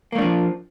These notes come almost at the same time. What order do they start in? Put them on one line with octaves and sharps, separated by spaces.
A#3 A3 D4 F3